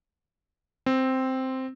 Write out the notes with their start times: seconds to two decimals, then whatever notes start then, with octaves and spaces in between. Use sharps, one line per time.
0.86 C4